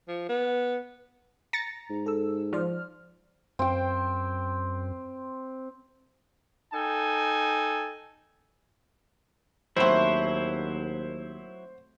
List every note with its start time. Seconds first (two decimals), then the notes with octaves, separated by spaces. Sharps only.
0.08 F3
0.29 B3
1.53 A#5 A6 A#6 C#7
1.90 G#2
2.06 A4 E6
2.53 F3 C5 D5 F6
3.59 F#2 C4 G5
6.73 D#4 A4 G5 G#5
9.76 D#2 F#3 A3 C4 E4 C5